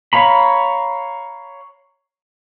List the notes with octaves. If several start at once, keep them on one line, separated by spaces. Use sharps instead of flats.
C#5 F5 A#5 B5